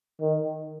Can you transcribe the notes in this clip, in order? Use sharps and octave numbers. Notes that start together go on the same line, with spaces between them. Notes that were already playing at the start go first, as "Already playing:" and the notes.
D#3